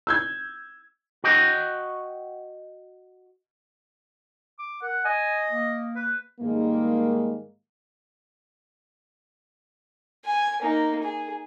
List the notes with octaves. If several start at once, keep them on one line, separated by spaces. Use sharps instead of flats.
E6 G6 G#6
F#4 D#5 G5
D6
A#4 F#5
D#5 G#5
A#3
B4
G#2 D#3 G3 G#3 A#3
G#5
A#3 D#4
G#4